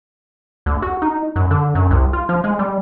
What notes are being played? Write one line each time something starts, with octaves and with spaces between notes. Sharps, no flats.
D2
F#4
D#4
F#2
D3
F#2
C2
F4
F3
G#3
G3